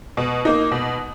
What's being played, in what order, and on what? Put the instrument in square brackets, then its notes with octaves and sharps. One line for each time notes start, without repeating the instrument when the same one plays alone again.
[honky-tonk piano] B2
A#3 D#4
B2